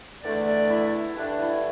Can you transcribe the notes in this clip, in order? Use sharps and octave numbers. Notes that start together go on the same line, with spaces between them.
E2 D3 A3 D5
E4
G2 D3 A3 D4
E4